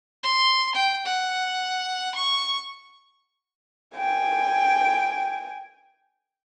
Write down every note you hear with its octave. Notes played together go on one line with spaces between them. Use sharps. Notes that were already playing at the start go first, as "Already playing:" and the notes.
C6
G5
F#5
C#6
G5 G#5